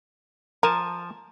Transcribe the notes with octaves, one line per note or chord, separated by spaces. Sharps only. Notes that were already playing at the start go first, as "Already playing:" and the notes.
F3 A#4 G#5 A5